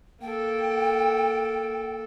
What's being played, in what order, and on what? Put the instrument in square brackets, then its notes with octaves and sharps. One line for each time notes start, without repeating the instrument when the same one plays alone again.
[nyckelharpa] A#3 A4 [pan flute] G5